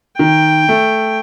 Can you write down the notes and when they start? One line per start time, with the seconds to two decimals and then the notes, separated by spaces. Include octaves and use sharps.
0.19 D#3 G5
0.69 A3